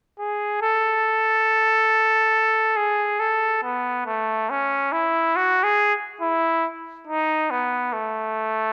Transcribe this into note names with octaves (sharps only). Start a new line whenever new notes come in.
G#4
A4
G#4
A4
B3
A3
C#4
E4
F#4
G#4
E4
D#4
B3
A3